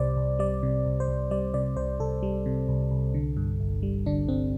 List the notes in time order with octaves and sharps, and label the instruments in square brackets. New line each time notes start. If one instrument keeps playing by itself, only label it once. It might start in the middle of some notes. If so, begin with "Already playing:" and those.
Already playing: [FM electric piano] C2 C3 G3 C5 D5
C2
G3 D5
C3
C2
C5
C2
G3 D5
C3 D5
C2 C5
C2 A4
G3
C3
C2
C2
D3
G2
G1
G3
D3 D4
G2 C4